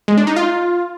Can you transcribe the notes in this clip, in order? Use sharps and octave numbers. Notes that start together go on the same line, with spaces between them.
G#3
D4
D#4
F4